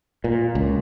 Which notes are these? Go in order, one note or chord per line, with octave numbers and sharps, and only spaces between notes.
A#2
C#2